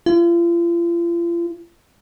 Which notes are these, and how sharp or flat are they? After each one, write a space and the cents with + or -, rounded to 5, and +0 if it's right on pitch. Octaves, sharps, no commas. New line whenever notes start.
F4 -40